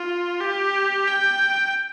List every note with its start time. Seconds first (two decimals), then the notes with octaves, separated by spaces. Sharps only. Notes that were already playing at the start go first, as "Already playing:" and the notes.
Already playing: F4
0.40 G4
1.07 G5